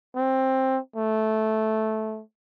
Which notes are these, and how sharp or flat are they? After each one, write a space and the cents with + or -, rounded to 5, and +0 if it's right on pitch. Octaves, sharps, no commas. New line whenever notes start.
C4 +10
A3 -10